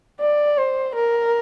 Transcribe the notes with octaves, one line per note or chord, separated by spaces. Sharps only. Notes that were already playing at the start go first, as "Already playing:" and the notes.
D5
C5
A#4